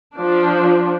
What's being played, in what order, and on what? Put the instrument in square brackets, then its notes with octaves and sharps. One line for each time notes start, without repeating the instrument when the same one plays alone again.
[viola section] F3 D4